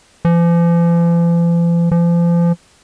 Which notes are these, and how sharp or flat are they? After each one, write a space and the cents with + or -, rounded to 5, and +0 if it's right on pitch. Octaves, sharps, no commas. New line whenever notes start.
F3 -45
F3 -35